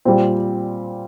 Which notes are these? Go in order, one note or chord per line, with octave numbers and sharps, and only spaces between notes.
A#2 G3 C4